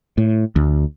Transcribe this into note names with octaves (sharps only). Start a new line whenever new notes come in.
A2
D2